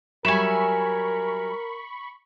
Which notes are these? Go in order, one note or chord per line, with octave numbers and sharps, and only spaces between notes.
F#3 G3 A#4 E5 G#5 B5 C#6